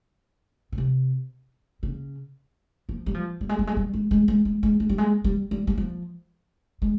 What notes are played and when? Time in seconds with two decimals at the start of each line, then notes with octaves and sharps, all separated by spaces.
0.72 C#3
0.78 C3
1.83 C#3
2.89 F3
3.06 G3
3.14 F3
3.41 G3
3.49 G#3
3.59 G3
3.67 G#3
3.77 G3
3.94 G#3
4.11 G#3
4.28 G#3
4.45 G#3
4.63 G#3
4.80 G#3
4.89 G3
4.98 G#3
5.24 G3
5.51 G3
5.67 G3
5.78 F3
6.82 G#3